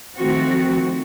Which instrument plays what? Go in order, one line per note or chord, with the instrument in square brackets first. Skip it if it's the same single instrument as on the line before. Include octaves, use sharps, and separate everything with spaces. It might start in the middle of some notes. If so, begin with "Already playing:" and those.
[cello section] D#3 F3 A3 C4 F#4